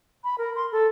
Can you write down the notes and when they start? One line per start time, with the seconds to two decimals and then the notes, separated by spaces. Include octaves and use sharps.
0.24 B5
0.38 A#4
0.55 C6
0.72 A4